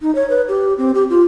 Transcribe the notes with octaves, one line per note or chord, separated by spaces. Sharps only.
D#4
C#5
B4
G4
C4
G4
F4